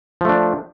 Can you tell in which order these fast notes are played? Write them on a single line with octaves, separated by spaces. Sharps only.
F3 A3 D4